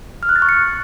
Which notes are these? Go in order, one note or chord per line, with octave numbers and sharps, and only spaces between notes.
F6
F#6
A6
C#6
C#7